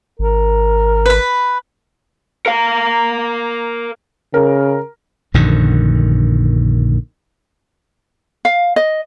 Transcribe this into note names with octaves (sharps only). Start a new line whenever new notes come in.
G#1 A#4
B4 B5
A#4 F5
C#3 A#4
A#1 F#2 D3 D#3
F5
D#5